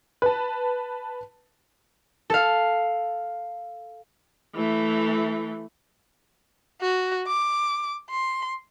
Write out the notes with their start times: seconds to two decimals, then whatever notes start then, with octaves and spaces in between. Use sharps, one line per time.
0.22 B4 A5
2.30 A4 F5
4.55 E3 A3
6.81 F#4
7.27 D6
8.11 C6